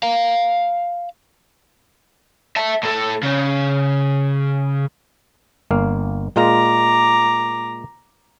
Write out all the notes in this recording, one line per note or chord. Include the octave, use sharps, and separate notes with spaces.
F5 A#5
E5 A5
A2 A4
C#3
G1 A#3 F5
A#2 G#3 F4 A#5 D6